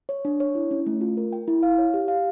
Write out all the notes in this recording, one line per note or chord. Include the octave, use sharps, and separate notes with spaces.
C#5
D4
C#5
E4
C#4
A3
F4
A#4
G5
E4
F5
C#5
G4
F5